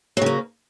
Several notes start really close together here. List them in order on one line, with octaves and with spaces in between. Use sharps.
F#3 C#3 A#3